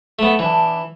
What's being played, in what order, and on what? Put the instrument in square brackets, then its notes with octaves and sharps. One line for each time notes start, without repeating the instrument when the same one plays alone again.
[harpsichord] A3 B3
[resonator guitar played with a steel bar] B2 D4 [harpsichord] E3